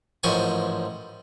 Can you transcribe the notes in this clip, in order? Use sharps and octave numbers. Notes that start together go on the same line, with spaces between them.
A1 G#2 F3 A#4 G#5 C#6